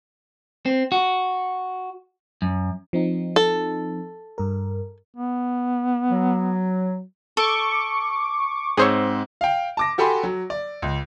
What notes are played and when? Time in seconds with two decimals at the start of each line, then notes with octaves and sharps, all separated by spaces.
0.66 C4
0.92 F#4
2.42 F#2
2.93 F3 C4 D#4
3.36 A4
4.38 G2 A#4
5.16 B3
6.09 F#3
7.37 A4 C#6 D6
8.77 G#2 C4 G#4 C5 C#5 E6
9.41 F5 G5
9.77 A5 D6 A#6
9.98 F#4 G4 A4 G#5 B5 C6
10.23 F#3
10.50 D5
10.82 C#2